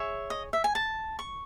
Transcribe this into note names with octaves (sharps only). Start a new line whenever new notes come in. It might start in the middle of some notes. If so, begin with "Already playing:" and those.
Already playing: G#4 C#5 E5
D#5
E5
G#5
A5
C#6